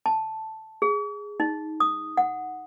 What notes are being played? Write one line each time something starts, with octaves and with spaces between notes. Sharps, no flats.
A5
G#4
D#4
D#6
F#5